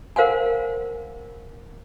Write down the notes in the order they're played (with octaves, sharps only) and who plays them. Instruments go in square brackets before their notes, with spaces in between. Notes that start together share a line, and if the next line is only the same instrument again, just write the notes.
[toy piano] A#4 C5 F5 F#5 G#5